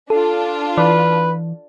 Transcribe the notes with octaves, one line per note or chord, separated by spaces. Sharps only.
D4 F4 A4
E3 B4 D5